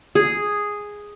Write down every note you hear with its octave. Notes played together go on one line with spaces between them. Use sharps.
G#4